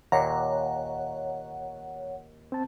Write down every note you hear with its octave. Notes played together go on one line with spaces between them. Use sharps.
D#2 A#2 C#5 F#5 A#5
C4 A5